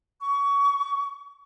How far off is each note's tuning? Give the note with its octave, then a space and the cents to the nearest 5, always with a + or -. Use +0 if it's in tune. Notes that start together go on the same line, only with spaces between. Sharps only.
C#6 +25